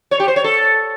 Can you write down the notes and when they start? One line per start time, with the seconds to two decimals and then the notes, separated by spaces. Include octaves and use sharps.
0.11 C#5
0.20 G4
0.28 C5
0.36 C#5
0.44 A4